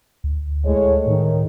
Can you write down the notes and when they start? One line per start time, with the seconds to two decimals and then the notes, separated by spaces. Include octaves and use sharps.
0.24 D2
0.64 A2 G#3 C#5
1.07 A2 D#3